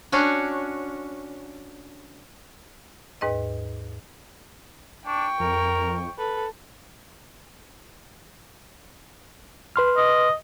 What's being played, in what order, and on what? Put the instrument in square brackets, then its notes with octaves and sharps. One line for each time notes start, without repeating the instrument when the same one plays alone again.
[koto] C#4 D4 F#4
[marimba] D#2 G#2 B4 D#5
[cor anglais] D4 [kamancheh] G5 C#6
[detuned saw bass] F2 [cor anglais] A#4
[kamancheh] A4 [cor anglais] B4
[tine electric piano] B4 C6 F6
[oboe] D#5